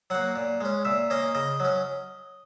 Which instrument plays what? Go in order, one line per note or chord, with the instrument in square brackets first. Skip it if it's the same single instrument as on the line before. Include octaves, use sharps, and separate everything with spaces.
[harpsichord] F#3 A#3 F#5
A#2
G#3 C#4
A#2 E5
A#3 C#4 D#5
C#3 D#5
F#3 C#4